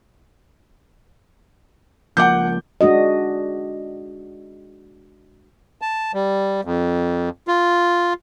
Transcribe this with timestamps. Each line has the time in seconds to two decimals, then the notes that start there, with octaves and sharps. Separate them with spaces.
2.17 C#2 F3 A#3 F#5 D6 G6
2.81 G#3 D4 F#4 D#5
5.82 A5
6.14 G3
6.64 F2
7.48 F4